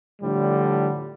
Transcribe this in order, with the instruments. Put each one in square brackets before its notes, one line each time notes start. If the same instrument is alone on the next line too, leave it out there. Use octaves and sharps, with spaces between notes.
[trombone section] A2 D3 F3 G3